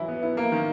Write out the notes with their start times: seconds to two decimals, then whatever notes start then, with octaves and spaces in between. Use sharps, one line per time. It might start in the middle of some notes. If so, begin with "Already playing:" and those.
Already playing: E3 F#3 E4
0.08 B3
0.23 E4
0.37 A#3
0.52 D#3